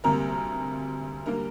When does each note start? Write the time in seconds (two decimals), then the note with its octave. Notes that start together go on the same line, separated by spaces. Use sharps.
0.04 D2 C3 G3 A#3 A#4 A#5
1.26 D3 G3 A#3 A#4 A#5